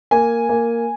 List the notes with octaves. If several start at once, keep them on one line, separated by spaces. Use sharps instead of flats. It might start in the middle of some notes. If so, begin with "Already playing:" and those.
A#3 G#5
A#3